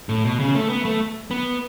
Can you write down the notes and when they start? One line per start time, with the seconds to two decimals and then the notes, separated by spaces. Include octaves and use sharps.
0.09 A2
0.24 B2
0.39 C#3
0.55 A3
0.70 B3
0.85 A3
1.31 B3